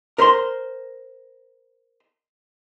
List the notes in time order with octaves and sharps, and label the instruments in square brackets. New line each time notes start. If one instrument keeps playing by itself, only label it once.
[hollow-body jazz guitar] A#4 C5 B5 C6